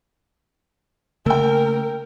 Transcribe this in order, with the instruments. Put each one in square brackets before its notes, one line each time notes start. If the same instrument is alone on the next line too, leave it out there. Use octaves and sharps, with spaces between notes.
[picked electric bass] C#3 A3 A#3 [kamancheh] A#4 [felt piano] G5 E6